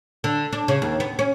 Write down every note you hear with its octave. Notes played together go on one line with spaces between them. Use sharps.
D3
D4
C#3
D#2
B3
C#4